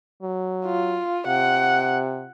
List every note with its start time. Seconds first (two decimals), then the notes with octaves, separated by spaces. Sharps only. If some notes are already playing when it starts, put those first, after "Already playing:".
0.23 F#3
0.65 F4
1.27 C3 F#5